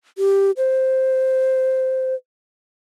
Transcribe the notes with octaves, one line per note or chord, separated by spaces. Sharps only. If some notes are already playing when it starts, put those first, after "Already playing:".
G4
C5